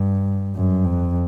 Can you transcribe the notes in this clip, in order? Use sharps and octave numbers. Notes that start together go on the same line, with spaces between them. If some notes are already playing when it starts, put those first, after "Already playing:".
Already playing: G2
F#2
F2